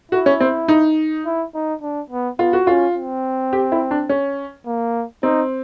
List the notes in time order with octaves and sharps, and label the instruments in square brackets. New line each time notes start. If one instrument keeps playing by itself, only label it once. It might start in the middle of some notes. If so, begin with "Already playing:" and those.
[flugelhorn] E4 [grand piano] F#4
[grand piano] C#4
C4
D#4
[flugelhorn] E4
D#4
D4
B3
[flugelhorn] B3 [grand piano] F4
[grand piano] F#4
[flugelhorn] C#4 [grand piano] F4
[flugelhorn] C4
[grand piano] G4
E4
D4
C#4
[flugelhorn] A#3
[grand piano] C4 [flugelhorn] D#4